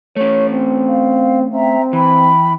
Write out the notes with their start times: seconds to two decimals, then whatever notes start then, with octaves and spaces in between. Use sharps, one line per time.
0.16 A3 C#4 C#5
0.51 C4
0.87 F5
1.52 C4 E5 G5 A#5
1.93 E3 G5 B5